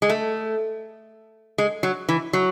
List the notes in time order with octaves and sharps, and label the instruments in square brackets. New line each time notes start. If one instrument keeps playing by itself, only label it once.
[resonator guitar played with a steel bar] G#3
A3
G#3
F#3
E3
F#3